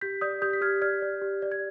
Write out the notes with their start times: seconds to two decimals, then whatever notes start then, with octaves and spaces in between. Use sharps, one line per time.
0.01 G4 G6 B6
0.21 D5 D#6 G6
0.42 G4 D#6 G6
0.53 B6
0.61 G4 F6 G#6
0.82 D5 F6 G#6
1.02 D5
1.22 G4
1.42 D5
1.52 G#6